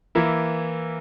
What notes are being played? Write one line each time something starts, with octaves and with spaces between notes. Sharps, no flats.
E3 A#3 E4